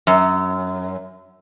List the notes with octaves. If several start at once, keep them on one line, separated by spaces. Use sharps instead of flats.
F#2